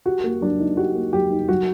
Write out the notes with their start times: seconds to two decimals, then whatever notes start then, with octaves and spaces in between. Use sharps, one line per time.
0.06 F#4 G4
0.24 A#3
0.41 F#3 D4
0.59 D#4
0.77 F#4 G4
0.95 A#3
1.13 F#3 G4
1.31 D#4
1.49 F#3 F#4